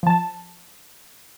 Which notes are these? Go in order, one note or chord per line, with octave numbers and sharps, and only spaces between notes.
F3 A5